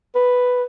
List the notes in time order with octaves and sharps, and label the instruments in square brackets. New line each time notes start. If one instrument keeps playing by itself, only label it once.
[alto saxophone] B4